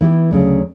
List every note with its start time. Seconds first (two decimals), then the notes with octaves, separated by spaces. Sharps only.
0.01 E3 B3 E4 G4
0.31 D2 C#3 F#3